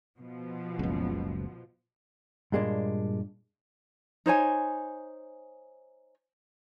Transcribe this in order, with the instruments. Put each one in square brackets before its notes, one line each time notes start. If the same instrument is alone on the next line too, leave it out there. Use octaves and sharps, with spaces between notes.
[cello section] B2 F3
[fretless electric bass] F#1 C#2
[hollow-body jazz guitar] G2 A#2 G#3 A#3 D4
[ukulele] D#4 C5 C#5 G#5